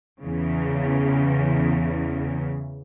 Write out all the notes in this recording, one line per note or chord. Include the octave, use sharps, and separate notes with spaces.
E2 C#3 E3